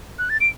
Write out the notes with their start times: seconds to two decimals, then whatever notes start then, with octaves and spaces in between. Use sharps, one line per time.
0.19 F#6
0.29 A6
0.40 D7